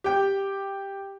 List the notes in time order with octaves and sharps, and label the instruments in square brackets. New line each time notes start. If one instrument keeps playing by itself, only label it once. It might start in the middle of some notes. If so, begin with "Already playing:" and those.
[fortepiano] G4 G5